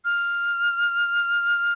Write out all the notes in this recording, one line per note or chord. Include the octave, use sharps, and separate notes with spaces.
F6